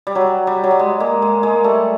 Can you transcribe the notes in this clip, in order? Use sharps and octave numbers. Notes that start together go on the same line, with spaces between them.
G3
F#3
G3
F#3
G3
G#3
G#3 A#3
G#3
G#3 A#3
G3 A3